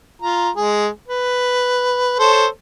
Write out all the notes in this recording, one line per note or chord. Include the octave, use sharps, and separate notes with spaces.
F4 A#5
G#3 G#4
B4
A4 C5 C#5